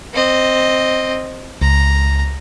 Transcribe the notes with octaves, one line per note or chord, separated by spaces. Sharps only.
C4 D#5
C#2 A#5